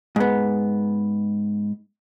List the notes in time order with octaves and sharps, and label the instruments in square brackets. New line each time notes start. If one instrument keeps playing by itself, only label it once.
[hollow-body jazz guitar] G#2 B3